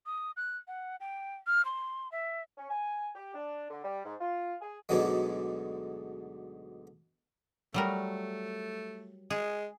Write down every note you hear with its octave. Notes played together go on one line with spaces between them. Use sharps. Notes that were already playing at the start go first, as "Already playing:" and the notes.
D#6
F#6
F#5
G5
F6
C6
E5
C#4
G#5
G4
D4
D3
G3
G#2
F4
G#4
D2 G#2 B2 D3 F#3 G#3
F#3 G3 A3 A#4
G#3 G#4